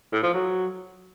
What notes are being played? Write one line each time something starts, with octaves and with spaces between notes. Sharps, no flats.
A2
F3
F#3